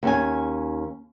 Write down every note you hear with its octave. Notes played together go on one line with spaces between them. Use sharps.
D#2 C#4 G#5